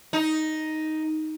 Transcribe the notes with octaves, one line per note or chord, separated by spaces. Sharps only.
D#4